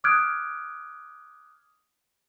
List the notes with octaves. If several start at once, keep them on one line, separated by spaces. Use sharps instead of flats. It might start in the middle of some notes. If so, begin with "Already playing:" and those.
D6 D#6 F6 F#6 G#6 D7